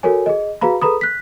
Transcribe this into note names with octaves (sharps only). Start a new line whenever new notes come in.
F#4 A4 A#4 C#5 G#5
G#4 D#5
F#4 G#4 B4 F5 A#5 B5
G#4 A4 B4 A#5 B5 D#6
F#6 B6